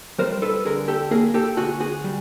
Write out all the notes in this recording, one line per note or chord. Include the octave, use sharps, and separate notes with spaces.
G3 A#4 C5
A4 B4
D3 G#4 A#4
G4 A4
A#3 G#4 A#4
G4 A4
D2 F#4 G#4
F#4 G#4
G3